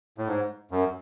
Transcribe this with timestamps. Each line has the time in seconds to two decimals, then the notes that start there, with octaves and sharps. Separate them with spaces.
0.18 A2
0.27 G#2
0.71 F#2